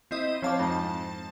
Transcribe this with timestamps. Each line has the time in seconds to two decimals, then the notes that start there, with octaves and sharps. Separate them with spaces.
0.11 C4 E4 D#5
0.42 F3 C4 C#5 F5 A5 D6
0.59 F2 G#2